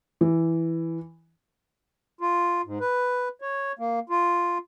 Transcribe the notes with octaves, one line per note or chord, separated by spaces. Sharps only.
E3
F4
G#2
B4
C#5
A#3
F4